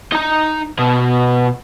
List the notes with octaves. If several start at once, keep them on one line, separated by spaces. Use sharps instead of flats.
D#4 A#5
B2